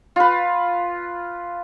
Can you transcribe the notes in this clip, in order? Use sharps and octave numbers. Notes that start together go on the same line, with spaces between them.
F4 B4